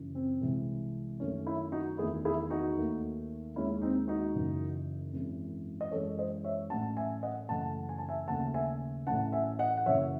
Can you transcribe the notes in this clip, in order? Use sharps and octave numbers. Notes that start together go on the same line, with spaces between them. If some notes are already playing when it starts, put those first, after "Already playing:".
Already playing: F#1 F#2 E3
C4
C2 C3 E3 G#3
F#2 D#3 F#3 A3 C#4
C#4 E4
D#4 F#4
E2 D#3 A3 E4 G#4
E4 G#4
D#4 F#4
D#2 D#3 A3
D#2 D#3 G#3 C#4 E4
C4 D#4
D#4 F#4
F#1 F#2 E3
G#1 F#2 E3 G#3
D#5
F#2 E3 G#3 A4 C#5
C5 D#5
C#5 E5
A1 A2 F#3 A3 F#5 A5
E5 G#5
D#5 F#5
F#1 F#2 E3 A3 F#5 A5
G#5
A5
E5 G#5
D#2 C#3 F#3 A3 F#5 A5
E5 G#5
A1 A2 E3 F#5 A5
E5 G#5
D#5 F#5
F#5
F#1 F#2 E3 C#5 E5